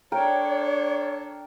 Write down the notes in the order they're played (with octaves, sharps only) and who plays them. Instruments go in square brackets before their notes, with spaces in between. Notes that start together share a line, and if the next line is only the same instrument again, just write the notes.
[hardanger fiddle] D4 A4 [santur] A#4 G5 [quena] C#5